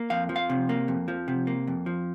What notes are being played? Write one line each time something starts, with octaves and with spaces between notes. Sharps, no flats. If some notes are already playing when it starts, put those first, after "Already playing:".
Already playing: A#3
F2 F5
F3
F5
C3
A#3
F2
F3
C3
A#3
F2
F3